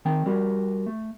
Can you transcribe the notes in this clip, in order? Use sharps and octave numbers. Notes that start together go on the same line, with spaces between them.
D#3 C4 G5
G3 F#4 G4 A#4
A3